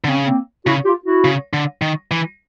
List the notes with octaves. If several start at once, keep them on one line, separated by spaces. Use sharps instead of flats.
D3
C#3 C4
C#4
A#3 C4
C#3 E4 F#4
F4 G4
E4 F#4
C#3
D3
D#3
E3